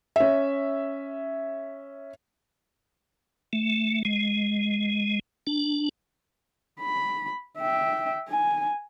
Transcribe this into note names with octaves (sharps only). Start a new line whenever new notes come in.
C#4 E5
A3
G#3
D4
B5
E5 G5
G#5